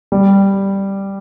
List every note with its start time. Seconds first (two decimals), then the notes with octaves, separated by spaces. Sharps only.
0.12 G3